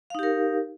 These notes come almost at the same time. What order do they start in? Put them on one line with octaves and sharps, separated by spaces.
F5 D#4 G4 A#4